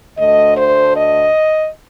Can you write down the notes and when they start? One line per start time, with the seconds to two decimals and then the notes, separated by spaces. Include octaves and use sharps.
0.16 D2 D3 A3 D#5
0.57 C5
0.96 D#5